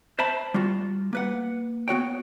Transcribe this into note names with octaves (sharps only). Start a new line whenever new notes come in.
C5 E5 A5 B5
G3 F4 F#4
A#3 B4 F#5
B3 F#4 C#5 G5